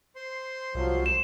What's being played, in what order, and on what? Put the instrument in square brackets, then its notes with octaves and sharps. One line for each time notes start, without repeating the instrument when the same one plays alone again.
[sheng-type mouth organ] C5 C6
[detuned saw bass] C2 [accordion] F3 F#3
[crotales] E7